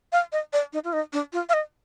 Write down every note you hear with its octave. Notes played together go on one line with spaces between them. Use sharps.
F5
D#5
D5
D#4
F4
D#4
D4
F4
F5
D#5